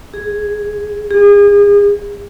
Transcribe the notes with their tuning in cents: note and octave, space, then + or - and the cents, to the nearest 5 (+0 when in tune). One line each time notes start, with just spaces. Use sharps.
G#4 +0
G#4 -35